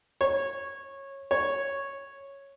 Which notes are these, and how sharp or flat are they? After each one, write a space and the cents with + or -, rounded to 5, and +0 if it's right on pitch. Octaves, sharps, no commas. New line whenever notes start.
C#5 -15
C#5 -5